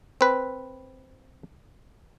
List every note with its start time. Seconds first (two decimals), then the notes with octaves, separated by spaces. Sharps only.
0.21 C4 B4